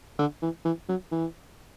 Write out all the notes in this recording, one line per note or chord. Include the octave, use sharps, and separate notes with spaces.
D3
E3
E3
F#3
E3